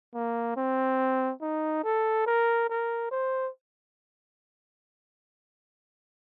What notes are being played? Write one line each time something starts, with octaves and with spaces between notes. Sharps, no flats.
A#3
C4
D#4
A4
A#4
A#4
C5